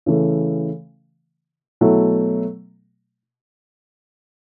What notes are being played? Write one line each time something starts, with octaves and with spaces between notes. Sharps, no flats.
C#3 E3 A3
B2 F#3 A3 E4